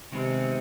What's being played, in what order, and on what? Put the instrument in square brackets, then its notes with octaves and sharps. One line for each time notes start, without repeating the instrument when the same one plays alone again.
[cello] C3 [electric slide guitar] D#3 G#3 B3 D#4 G#4